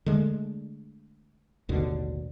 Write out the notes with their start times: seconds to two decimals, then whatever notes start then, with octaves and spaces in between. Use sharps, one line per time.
0.06 D3 G#3 A3
1.69 A1 D#2 B2 D3